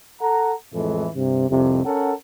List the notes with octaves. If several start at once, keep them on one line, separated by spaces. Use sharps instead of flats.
A4 F#5 A#5
F2 A2 E3 G#3 A3
G2 C3
C2 F2 C3
C#4 A4 A#4 F#5